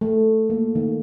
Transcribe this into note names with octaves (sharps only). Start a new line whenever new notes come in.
A3
A#3
D#3